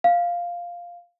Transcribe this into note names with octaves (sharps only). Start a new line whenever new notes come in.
F5